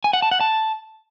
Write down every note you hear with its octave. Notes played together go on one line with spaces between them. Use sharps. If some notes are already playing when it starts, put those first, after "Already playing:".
G#5
F#5
A5
F#5
A5